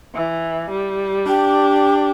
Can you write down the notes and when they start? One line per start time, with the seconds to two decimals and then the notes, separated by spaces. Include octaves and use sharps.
0.15 E3
0.71 G3
1.26 D4 G4